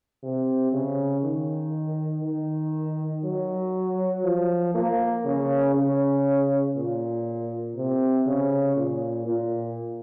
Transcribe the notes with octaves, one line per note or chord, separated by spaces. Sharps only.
C3
C#3
D#3
D#3
F#3
F3
A#3
C#3
C#3
A#2
C3
C#3
A#2
A#2